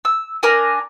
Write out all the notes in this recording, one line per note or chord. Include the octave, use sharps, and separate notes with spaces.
E6
D4 A#4 G#5